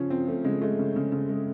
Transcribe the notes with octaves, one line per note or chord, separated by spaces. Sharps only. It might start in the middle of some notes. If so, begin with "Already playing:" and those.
Already playing: C#3 F3 C#4
F3 C4
F3 A3
C#3 G#3
G#3 A3
C#3
C#3
C#3
G#3